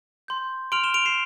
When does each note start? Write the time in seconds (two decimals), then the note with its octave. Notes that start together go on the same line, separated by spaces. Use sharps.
0.28 C6 G6
0.72 C6 F6 D7 F7
0.84 E7 G7
0.94 D7 F7
1.05 C7 E7